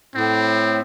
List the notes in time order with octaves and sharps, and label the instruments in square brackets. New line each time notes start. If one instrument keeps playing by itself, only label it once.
[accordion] A2 [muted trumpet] C4